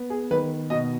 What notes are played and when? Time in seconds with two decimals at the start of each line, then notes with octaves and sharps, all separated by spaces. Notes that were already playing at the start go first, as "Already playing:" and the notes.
Already playing: B3
0.10 G#4
0.31 D#3 B4
0.70 B2 D#5